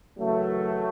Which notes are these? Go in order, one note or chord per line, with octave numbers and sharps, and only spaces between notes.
F#2 C#3 E3 F#3 A3